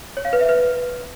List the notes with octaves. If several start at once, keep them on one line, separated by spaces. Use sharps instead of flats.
C#5
F5
B4
E5
B4